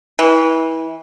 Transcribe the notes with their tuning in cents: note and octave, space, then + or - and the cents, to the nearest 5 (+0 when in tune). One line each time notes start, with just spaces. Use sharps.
E3 -25